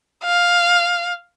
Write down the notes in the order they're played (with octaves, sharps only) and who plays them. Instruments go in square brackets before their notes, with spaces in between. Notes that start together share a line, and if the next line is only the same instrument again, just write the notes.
[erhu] F5